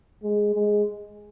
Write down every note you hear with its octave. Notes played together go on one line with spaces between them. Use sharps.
G#3
G#3